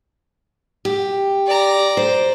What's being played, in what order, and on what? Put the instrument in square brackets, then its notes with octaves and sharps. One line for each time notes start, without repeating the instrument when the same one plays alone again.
[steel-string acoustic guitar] G4
[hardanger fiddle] D5 A#5
[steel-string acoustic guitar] C5